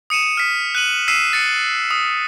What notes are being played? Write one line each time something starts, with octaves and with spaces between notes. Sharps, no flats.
D#6 C#7 D#7 E7
F6 B6
F#6 D#7 F#7
E6 B6 C7 D#7 E7
A6 C#7
D#6